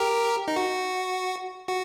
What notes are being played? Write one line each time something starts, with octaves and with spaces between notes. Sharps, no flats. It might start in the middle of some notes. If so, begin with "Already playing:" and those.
Already playing: G4 A#4
D#4
F#4
F#4